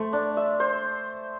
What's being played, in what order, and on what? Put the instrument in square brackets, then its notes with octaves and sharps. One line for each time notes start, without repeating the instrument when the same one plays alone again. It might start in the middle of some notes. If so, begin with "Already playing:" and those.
Already playing: [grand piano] A3 [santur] C5
[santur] D4
E5
C5